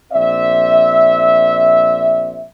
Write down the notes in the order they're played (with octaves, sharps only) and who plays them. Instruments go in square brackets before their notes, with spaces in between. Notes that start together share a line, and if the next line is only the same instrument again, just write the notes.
[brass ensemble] A#1 C4 D5 E5